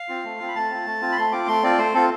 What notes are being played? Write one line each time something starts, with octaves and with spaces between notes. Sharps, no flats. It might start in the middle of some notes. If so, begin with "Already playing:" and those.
Already playing: F5
C4 F4
A3
C4 F4
B5
A3 A5
C4 F4
A3
C4 F4
B5
A3 C6
C4 F4 D6
A3 C6
C4 F4 D5
A3 C5
C4 F4 A4